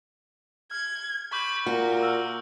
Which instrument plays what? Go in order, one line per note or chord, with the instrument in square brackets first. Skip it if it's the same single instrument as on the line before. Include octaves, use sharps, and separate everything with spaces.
[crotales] F6 [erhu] G#6
[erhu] B5 [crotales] C#6 D6 G6
[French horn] A#2 [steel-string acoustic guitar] F#4 [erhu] A#4
[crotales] E6 F6